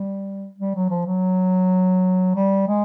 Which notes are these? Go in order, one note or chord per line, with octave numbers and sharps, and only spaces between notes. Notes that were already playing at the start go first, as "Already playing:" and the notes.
Already playing: G3
G3
F#3
F3
F#3
G3
G#3